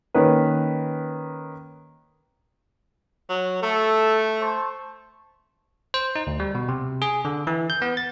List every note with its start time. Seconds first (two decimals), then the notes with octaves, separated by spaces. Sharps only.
0.14 D#3 A#3 C#4 B4
3.30 F#3
3.63 A3 A4
4.40 C5 A5 C#6
5.94 C5
6.16 D#4
6.27 D2
6.40 G3
6.55 B2
6.69 C3
7.02 G#4
7.25 D3
7.47 E3
7.70 G6
7.82 B3
7.97 A6